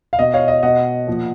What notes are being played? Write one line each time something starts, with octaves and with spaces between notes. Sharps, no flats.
F5
B2 D#5
C#5 F5
D#5
B2 D#5 F#5
A#2 F3